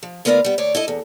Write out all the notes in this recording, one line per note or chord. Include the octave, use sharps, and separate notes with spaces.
F3
D2 B3 F4 A#4 D5 F5
G3 B3
D2 C#5 D5
E4 A4 D#5
E2